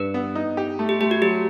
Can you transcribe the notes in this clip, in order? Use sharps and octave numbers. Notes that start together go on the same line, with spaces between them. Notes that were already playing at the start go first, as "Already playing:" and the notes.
Already playing: G2 B4
B3
D#4
G4
A3
G4
A3 G4
F#4
F#3 G4